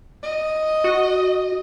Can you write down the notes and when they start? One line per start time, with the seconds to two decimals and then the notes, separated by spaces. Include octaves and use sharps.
0.23 D#5
0.84 F#4